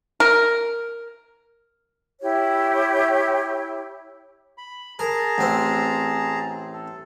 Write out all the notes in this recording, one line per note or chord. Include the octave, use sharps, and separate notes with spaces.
A#4
E4 G4 C#5
B5
G#4 A#4 A5 A#5
A1 C4
A4